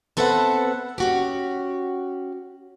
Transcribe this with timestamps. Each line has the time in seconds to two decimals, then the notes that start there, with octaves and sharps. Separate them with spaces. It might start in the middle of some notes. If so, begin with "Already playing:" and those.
0.17 B3 C4 A4 B4 E5 F#5
0.98 C#4 F#4 G4